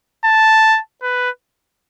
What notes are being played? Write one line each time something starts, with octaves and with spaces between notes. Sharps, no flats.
A5
B4